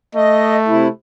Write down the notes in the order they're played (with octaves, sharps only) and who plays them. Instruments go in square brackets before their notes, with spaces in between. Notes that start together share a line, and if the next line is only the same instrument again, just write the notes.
[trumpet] A3 [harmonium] D#5
[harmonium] C3 E4